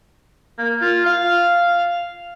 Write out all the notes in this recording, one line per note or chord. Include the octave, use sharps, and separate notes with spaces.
A#3
F4
F5